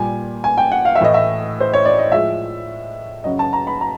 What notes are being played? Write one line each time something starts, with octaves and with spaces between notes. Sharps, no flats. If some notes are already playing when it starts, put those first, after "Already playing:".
Already playing: A#2 G3 G#5
G#5
G5
F#5
F5
E5
A2 E3 A3 D#5
E5
C5
C#5
D5
D#5
A2 F3 G#3 E5
F#2 C#3 F#3 D#5
A5
A#5
B5
A#5